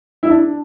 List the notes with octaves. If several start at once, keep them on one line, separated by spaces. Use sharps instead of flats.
E4
D4